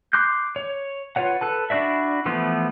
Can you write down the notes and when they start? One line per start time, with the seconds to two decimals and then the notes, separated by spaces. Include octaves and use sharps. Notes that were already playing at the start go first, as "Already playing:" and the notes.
0.13 C6 D6 F#6 G6
0.56 C#5
1.16 F4 B4 C#5 F#5
1.41 A4 B4 A5
1.70 D4 E4 F#4 D5 E5
2.26 E3 F3 A3 B3 C6